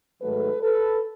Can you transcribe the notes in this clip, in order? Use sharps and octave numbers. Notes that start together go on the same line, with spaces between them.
G#2 D#3 F#3 A3 A4 B4
A4 B4